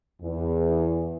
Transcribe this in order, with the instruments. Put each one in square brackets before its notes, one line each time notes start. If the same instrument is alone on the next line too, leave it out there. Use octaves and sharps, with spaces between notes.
[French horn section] E2